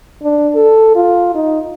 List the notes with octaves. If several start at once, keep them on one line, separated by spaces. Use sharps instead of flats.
D4
A4
F4
D#4